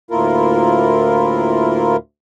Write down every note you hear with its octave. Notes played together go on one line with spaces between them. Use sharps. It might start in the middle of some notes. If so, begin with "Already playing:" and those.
D2 A2 A#3 E4 F4 A#4